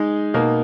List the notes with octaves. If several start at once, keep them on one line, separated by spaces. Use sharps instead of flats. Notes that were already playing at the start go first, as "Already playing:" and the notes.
Already playing: G#3 D#4 G#4
B2 A#3 D#4 A#4